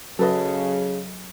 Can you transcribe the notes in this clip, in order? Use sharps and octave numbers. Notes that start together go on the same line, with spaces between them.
C#3 F#3 A4 B4 D#5